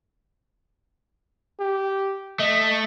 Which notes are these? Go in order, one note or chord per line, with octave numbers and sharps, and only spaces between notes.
G4
A3 D#5